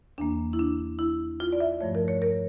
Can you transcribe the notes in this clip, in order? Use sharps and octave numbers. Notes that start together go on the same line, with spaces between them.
E2 E3 A#3 D4
E4
D4
E4
F4
D5
E5
G2 F3 A3 C#5
A#4
C#5
A#4